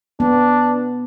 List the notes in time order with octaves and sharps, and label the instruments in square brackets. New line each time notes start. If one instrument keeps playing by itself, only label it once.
[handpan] B3 [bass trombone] D4